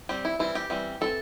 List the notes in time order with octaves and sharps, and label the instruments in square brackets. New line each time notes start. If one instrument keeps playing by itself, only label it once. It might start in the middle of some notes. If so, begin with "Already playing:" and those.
[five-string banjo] G3 C4 G4
E4
E3 G3 C4 E4
G4
E3 G3 C4
E3 G3 C4 A4